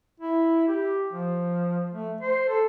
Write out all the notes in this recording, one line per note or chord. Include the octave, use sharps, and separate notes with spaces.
E4
G4
F3
A3
C5
A4